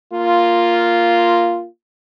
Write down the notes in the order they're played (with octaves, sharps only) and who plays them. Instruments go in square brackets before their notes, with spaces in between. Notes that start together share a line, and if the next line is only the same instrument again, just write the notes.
[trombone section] A#3 F4